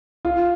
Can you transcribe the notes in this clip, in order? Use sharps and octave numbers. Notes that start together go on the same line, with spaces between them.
F4